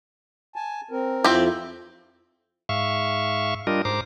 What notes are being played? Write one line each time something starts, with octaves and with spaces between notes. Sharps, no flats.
G#5 A5
C4 A#4
F2 C4 E4 F4 G4
G#2 E5 F5 C#6
G3 D4 F4 A#4 D#5
G#2 C5 A#5 D6